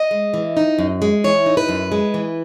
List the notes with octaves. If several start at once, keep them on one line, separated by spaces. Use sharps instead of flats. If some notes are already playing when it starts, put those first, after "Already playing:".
Already playing: D#5
G#3
E3
D#4
F#2
G#3
E3 C#5
D#4
B4
F#2
G#3
E3